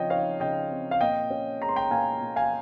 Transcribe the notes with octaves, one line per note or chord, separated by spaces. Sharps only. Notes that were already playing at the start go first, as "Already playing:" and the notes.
Already playing: C#3 F3 C4 C#5 D#5 G5
D#4 C#5 F5
C#3 D#5 G5
C4
F5
A#2 D#5 G5
C#4
G#3 A#5
C6
G5 A#5
A#2 F5 G#5
A#2
F5 G#5